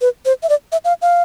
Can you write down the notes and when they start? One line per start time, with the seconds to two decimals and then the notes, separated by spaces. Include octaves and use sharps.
0.01 B4
0.25 C5
0.43 E5
0.49 D5
0.72 E5
0.85 F5
1.02 F5